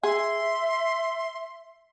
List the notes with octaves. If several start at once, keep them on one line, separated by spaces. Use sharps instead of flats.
G#4 E5 C6